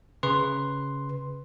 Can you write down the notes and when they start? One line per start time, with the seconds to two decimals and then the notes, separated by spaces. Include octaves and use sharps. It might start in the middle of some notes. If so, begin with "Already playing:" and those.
0.23 C#3 B4 C6